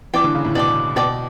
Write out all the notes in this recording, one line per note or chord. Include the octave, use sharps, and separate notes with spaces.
E3 D5 G5 D6
D3
C#3
A2
B2 D5 G5 D6
B2 D5 G5 D6